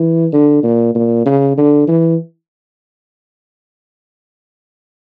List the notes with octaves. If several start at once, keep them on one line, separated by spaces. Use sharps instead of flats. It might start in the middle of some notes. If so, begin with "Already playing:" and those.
Already playing: E3
D3
A#2
A#2
C#3
D3
E3